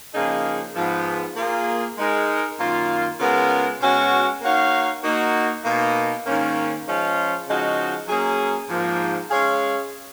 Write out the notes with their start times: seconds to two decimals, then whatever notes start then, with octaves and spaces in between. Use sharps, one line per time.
0.14 C#3 F3 A#3 D#4 G#4
0.76 G#2 F3 B3
1.37 A#3 F4 G#4
1.98 G#3 D#4 A#4
2.59 F#2 D#3 A#3 F4
3.19 C#3 G#3 B3 F4 A#4
3.81 B2 G#3 C#4 F#4
4.42 A#3 D#4 F#4 C#5 F5
5.03 A#3 D#4 F#4
5.64 B2 A#3 D#4
6.25 G#2 D#3 A#3 C#4
6.86 F3 G#3 C#4 F4
7.47 C#3 F3 G#3 D#4 F#4
8.08 F#3 A#3 C#4 G#4
8.69 G#2 F3 A#3
9.30 G#3 C#4 G#4 C#5 F5